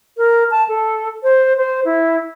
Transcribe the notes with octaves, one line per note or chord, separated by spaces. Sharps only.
A#4
A5
A4
C5
C5
E4